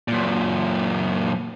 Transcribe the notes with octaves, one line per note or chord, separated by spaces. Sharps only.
F#2 A#2